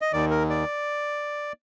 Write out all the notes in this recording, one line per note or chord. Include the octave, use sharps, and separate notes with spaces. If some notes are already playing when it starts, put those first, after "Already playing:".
D#5
D#2 D#3 D5
A#4
D5